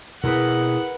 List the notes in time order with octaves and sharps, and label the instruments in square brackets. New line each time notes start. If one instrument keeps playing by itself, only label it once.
[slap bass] B2 C4 [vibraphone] E4 G#4 D#6 [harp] A#4 B4 [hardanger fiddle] F#5